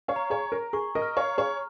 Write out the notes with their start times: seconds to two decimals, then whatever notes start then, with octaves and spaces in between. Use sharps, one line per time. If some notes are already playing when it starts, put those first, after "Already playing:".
0.08 C#5 F5
0.16 A#5
0.30 G#4 C#5
0.45 A#5
0.52 A#4
0.73 G#4 C#6
0.95 A#4 D#5
1.02 F6
1.17 C#5 F5
1.31 A#5
1.38 G#4 C#5